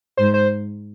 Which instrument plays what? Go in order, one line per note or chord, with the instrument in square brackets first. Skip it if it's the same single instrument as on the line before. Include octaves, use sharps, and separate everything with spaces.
[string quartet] G#2 [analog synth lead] C5
[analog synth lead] C5